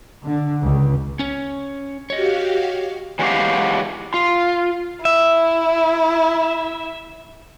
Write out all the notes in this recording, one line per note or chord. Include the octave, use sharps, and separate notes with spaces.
D3
C#2
C#4 C#5
F#4 G4 C#5 D#5 F5
E3 F#3 G#3 F#4 G4 F5
F4
E4 E5